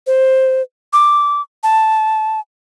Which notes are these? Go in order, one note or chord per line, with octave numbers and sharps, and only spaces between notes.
C5
D6
A5